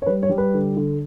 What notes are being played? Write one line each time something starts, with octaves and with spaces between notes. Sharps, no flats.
C#5
G3 B4
C#5
G3
B4
D3
D3